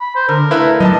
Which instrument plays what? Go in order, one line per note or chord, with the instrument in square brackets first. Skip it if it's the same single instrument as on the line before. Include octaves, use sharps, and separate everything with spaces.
[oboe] B5
C5
[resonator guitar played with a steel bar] D3 [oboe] A#4
[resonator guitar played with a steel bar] A3 B4 F5 [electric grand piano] E4
[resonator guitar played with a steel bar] G2 F3 [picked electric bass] F#3 [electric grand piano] D#5 A5